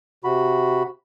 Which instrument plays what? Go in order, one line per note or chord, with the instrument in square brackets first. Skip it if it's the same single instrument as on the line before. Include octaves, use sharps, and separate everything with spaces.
[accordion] C3 F#4 B5